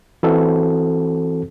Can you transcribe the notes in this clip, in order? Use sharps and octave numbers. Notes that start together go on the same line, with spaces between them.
E3 C4 F#4 A4